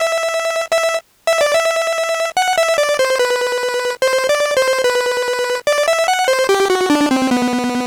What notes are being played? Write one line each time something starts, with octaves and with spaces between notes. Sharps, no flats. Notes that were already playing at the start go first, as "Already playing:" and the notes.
Already playing: E5
E5
E5
D5
E5
F#5
E5
D5
C5
B4
C5
D5
C5
B4
D5
E5
F#5
C5
G4
F#4
D4
C4
B3